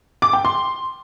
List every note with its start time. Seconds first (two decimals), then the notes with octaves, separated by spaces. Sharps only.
0.22 D6
0.33 G5
0.45 C6